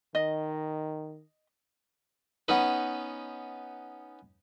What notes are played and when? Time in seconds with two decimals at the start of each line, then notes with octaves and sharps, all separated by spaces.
0.15 D#3 D#5
2.48 B3 C#4 D#4 B4